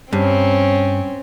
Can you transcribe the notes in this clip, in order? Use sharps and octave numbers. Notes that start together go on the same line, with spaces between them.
G2 C4 C#4